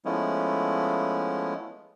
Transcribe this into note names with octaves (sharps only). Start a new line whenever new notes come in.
F3 G#3 A3 B3 C#4 E4